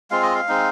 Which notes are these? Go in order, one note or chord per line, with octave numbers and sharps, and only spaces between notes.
G#3 C4 F4 F5
D#5
F5
G#3 C4 D#4